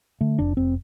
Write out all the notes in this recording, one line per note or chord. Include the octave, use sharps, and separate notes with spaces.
D3 A3
F1 D4
F1 C4